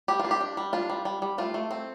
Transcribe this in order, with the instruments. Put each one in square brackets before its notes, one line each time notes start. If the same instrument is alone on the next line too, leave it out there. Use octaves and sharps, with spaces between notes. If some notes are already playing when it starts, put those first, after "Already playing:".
[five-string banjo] G3 G4
F4
D4
G4
D4
G3
D4 F4
G3
G3
G3
A3 F4
A3
C4